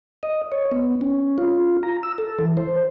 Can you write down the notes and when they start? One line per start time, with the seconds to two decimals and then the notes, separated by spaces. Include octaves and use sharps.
0.23 D#5
0.52 C#5
0.72 B3
1.01 C#4
1.38 F4
1.83 A#5
2.03 E6
2.18 A4
2.39 E3
2.57 C5